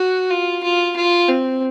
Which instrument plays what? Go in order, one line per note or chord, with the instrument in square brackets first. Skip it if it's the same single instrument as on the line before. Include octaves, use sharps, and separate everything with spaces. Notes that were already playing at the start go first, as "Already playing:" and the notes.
Already playing: [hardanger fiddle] F#4
F4
F4
F4
C4